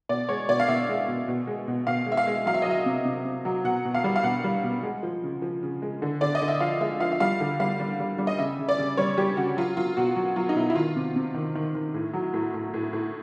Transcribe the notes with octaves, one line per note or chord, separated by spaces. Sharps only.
B2 D5
G#3 C#5
B2 D5
F5
B2 E5
G#3
B2
B2
G#3
B2
B2 F5
G#3
E5
F5
G#3
F#3 F5
E5
D#5
F#3 E5
C3
C3
C3
F#3
B2 F#5
B2
F5
G3
F5
B2 F#5
G3
B2
G#3
F3
C#3
F3
C#3
G#3
D3
D3 D5
D#5
D3
E5
F3 F5
G#3 E5
F3 F5
E5
G3 F5
D3
G3 F5
G3
G3
G3
D#5
C#3 E5
C#3
D5
C#3
G3 C#5
G3 G4
C#3 F#4
F#3 F4
F#3 F4
B2 F#4
F#3
F#3 F4
D#4
B2 E4
E4
D#3 F4
C3
C3
D#3
D#3
D#3
A2
F#3
A2
A2
A2
A2